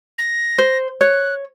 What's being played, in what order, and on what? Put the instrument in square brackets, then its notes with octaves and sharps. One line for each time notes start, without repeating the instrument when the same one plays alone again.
[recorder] A#6
[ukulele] C5
[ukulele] C#5 [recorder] F#6